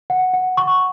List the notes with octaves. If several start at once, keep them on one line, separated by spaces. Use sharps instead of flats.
F#5
F#5
C#6